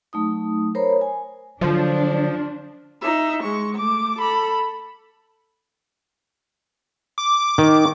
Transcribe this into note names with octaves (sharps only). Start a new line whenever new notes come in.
F#3 A3 D#4 D#6
A#4 C5 C#5 A#5 B5
G#5
D3 F3 F#3 D4
D#4 E5
G#3 C#6
A3 D6
A4 B5
D6
D#3